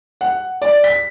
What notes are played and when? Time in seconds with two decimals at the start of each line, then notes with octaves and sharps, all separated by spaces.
0.21 F#5
0.62 D5
0.84 B6